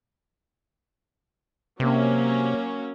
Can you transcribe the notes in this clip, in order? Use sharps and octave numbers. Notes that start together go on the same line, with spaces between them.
C3 F#3 A#3 C#4